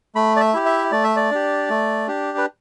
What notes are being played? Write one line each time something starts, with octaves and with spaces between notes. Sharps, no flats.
A3 B5
D5
E5
E4 G4
E5
A3 D5
E5
D5
D4 G4
A3
D4 G4
B4